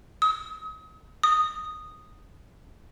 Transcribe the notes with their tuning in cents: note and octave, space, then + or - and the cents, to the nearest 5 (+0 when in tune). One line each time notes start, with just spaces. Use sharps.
D#6 +35
D#6 -5